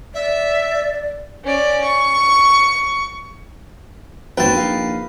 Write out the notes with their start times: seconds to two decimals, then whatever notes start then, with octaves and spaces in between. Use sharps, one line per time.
0.14 D5 E5
1.44 C#4 D5
1.84 C#6
4.37 G#1 A#3 C4 F#4 B4 G5 A5
4.53 A#1 D#4 F5